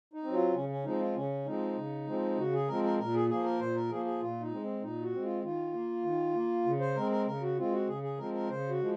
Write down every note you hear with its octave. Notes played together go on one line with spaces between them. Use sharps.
D#4
F#3 C4
F4
C#3 C#4
C#4
F3 G#3 C4 D#4
F4
C#3 C#4
F3 G#3 C4 D#4
C#3
F3 G#3 C4
C#3 F#4
G#4
F3 G#3 C4 A#4
A#4
A#2 A#4
G#4
F3 A#3 G#4
A#4
A#2 C5
A#4
F3 A#3 G#4
G#4
A#2 F4
D#4
G#3 C4
C4
A#2 D#4
F#4
G#3 C4
F4
D#3 F4
A#3
D#3
A#3
C#3
C5
G#3 C4 A#4
A#4
C#3 A#4
F#4
G#3 C4 F4
F#4
C#3 G#4
G#4
F3 G#3 C4 A#4
A#4
C#3 C5
F#4
F3 G#3